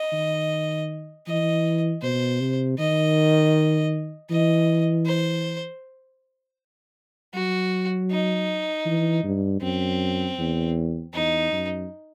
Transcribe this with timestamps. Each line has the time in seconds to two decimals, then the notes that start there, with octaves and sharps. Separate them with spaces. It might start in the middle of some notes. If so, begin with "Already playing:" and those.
Already playing: D#5
0.12 D#3
1.27 E3 D#5
2.03 B2 C5
2.40 C3
2.79 D#3 D#5
4.30 E3 D#5
5.06 C5
7.34 F#3 F#4
8.10 D#4
8.86 E3
9.23 G2
9.62 F#2 C4
10.38 E2
11.14 E2 D#4
11.52 F#2